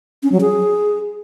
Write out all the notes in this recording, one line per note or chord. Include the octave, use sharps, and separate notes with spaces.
C#4
F#3
G#4